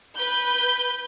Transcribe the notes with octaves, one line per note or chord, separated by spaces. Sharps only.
B4 G6